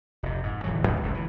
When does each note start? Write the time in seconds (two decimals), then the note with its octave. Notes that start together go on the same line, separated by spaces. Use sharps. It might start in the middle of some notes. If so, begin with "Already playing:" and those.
0.23 F1 C3
0.43 G#2
0.64 D1 E3 F#3
0.87 D2 A2
1.01 F#1 C#2 C#3
1.14 E3